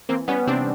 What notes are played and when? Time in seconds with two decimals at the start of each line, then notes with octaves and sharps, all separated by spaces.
0.09 E3 A#3 C4
0.28 G3 B3 C#4
0.47 C3 C4 D4